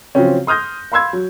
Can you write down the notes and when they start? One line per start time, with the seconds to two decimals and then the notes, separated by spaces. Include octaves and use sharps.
0.15 C#3 F3 F#3 C4 C#4
0.47 C6 D#6 F6 G6 A#6
0.92 F5 B5 C6 E6 G#6
1.13 F#3